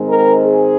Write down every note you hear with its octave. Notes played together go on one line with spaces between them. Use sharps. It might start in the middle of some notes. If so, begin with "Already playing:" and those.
Already playing: G#2 D#3 G#3 C4
A#4
G#4